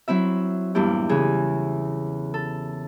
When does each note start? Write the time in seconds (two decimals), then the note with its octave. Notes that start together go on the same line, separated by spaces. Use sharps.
0.08 F#3 C4 E4 E5
0.75 E2 G2 A#2 E4 G4
1.09 C#3 E3 G#4
2.34 A4